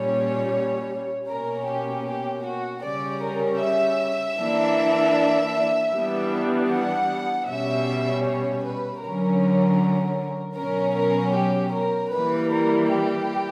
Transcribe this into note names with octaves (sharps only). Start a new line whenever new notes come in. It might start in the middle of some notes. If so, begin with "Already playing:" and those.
Already playing: A#2 G3 C#4 C#5
B2 A#3 C#4 A#4
G4
G4
F#4
C#3 G3 C#4 D5
A#4
E5
E3 A#3 D4
E3 G3 B3 D4
F#5
B2 G3 C#4 E5
C#5
B4
D3 F#3 C#4 A#4
B2 F#3 C#4 A#4
A#4
G4
A#4
E3 G3 A#3 B4
A#4
G4